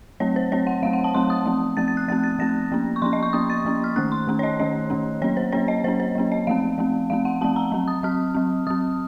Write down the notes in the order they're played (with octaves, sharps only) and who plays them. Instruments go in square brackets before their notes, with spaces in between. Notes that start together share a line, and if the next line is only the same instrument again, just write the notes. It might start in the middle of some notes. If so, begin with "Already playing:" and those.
[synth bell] F#3 A3 C4 C#5
C5
F#3 A3 C4 C#5
F#5
F#3 A3 C4 F5
F#5
A5
F#3 A3 C4 C6
D#6
F3 A3 C4
F3 A3 C4 A6
A6
F#6
F3 A3 C4 A6
A6
F3 A3 C4 A#6
F3 A#3 C#4
C#6
F3 A#3 C#4 C6
D#5
C#6
F3 A#3 C#4 D#6
A6
F3 A#3 C#4
F6
D#3 A3 C#4 F#6
C6
D#3 A3 C#4
C#5
D#5
D#3 A3 C#4 D#5
D#3 A3 C#4
F#3 A#3 C#4 C#5
C5
F#3 A#3 C#4 C#5
D#5
F#3 A#3 C#4 C5
C5
F#3 A#3 C#4
D#5
F3 A3 C4 F5
F3 A3 C4
F3 A3 C4 F5
F#5
F3 A3 C4 A5
A#5
F#3 C4
D#6
F#3 C4 F6
F#3 C4
F#3 C4 D#6